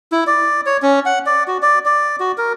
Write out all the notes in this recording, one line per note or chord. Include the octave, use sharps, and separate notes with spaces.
E4
D5
C#5
C#4
F#5
D5
F#4
D5
D5
F#4
A#4